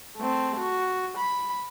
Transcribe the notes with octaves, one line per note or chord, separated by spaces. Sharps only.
A3 C4
F#4
B5